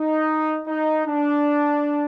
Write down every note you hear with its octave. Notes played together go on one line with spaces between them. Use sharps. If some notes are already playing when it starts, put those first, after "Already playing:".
Already playing: D#4
D#4
D4